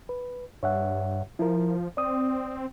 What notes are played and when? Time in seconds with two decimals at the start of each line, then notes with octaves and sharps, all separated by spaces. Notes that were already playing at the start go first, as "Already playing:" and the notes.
0.09 B4
0.63 G2 C#5 E5 F#5
1.39 F3 E4 A#4
1.97 C4 D5 D#6